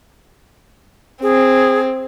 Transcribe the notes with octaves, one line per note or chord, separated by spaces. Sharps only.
C4 G#4